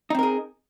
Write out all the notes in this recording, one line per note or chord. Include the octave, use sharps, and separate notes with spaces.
C4 D#4 G#4 A#4